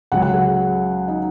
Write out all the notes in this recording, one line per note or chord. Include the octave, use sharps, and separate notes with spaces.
C#2 C#3 F#3 F#5
F#5
G#4
D#4